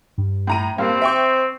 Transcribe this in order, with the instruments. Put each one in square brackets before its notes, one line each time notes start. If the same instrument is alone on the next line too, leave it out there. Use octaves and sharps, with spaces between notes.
[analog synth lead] G2
[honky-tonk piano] A2 A#5 D#7
[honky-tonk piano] G2 A#3 [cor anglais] C4 [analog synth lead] F5
[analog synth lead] C5 [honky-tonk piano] E5 G5 C#6